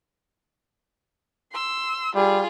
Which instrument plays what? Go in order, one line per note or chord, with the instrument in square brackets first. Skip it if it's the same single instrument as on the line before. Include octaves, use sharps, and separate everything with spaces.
[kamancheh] C6 E6
[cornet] G3 [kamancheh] F4 G#4